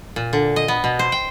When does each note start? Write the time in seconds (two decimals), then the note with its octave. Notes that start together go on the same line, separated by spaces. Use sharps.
0.16 A#2
0.33 D3
0.56 D#5
0.68 B3
0.84 B2
0.99 C5
1.12 G5